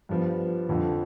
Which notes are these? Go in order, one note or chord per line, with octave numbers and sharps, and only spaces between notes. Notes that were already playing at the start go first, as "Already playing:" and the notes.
G2 F3 B3
F2 D3 F3